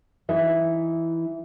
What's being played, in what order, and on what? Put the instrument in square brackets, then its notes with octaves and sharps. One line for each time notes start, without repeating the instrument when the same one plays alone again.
[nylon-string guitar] E3 D#4 E5